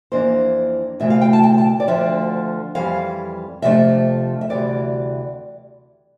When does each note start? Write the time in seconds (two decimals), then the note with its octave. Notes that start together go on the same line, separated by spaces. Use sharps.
0.12 F2 E3 A#3 D4 C5
1.00 D2 C3 E3 A3 E5
1.10 F5
1.21 G5
1.33 A5
1.43 G5
1.58 A5
1.80 D5
1.87 D2 D3 F3 E5
2.75 F2 E3 G3 F5
3.62 F2 C3 F3 A3 D4 E5
4.41 E5
4.50 D2 C3 E3 G3 D5